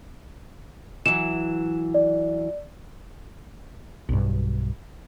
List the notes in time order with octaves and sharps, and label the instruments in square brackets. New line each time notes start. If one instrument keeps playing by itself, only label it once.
[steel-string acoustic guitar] E3 F#3 [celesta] E7
[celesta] D5
[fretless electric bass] B1 G2